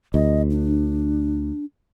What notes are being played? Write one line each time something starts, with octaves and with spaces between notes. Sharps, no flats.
D2 D#5
D4